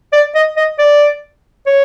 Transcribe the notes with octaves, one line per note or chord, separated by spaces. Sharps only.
D5
D#5
D#5
D5
C#5